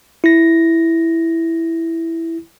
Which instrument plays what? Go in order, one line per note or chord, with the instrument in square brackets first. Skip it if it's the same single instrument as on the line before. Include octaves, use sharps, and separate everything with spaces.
[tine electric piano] E4 A#6